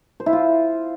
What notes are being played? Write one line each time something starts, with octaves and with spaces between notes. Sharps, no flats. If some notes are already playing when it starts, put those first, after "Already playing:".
C5
E4
F4